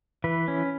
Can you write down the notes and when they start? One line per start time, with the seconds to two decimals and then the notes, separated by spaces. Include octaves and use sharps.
0.24 E3 B4
0.48 C#4